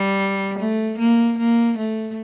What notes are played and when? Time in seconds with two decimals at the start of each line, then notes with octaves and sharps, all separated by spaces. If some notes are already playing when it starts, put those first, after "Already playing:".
Already playing: G3
0.59 A3
0.99 A#3
1.38 A#3
1.78 A3